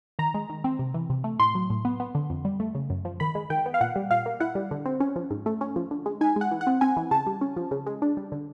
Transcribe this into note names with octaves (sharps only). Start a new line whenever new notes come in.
D#3 A#5
G#3
D#3
C4
C3
E3
C3
A3
A2 C6
F#3
A2
B3
B3
D3
F2
G3
A3
C#3
F#2
F3
D#3 B5
G#3
D#3 G5
B3
F5
A#2 F#5
G3
A#2 F5
A#3
E4 F#5
G3
D3
C4
C#4
F3
G#2
A3
C#4
F3
D3
G#3
D#4 G#5
G#3 F#5
E3
F#5
C4
C4 G#5
E3
C#3 A5
G3
C#4
F3
C#3
G#3
D4
G3
D3